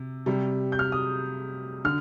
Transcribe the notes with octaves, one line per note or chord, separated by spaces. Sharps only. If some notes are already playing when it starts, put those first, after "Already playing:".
Already playing: C3
C3 G3
G6
F6
D#6
D3 F6